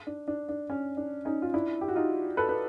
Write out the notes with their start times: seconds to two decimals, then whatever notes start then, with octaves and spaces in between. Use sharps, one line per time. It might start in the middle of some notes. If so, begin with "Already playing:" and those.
0.07 D4
0.28 D4
0.49 D4
0.70 C#4
0.97 D4
1.25 C#4 D#4
1.42 F4
1.54 D4 E4
1.81 G4
1.88 F#4
1.96 D#4 F4
2.37 A4 B4
2.49 B4